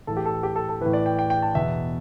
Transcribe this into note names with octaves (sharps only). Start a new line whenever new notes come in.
A2 E3 A4
G4
A4
G4
A4
A4
E3 B4
A2
D5
G5
G5
G5
A5
E2 B2 E5